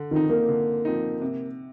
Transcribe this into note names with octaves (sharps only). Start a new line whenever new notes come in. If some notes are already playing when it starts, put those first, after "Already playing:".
Already playing: D3
D#3 F3 C4 D#4
A#3
D3
F3 C4 D#4
C3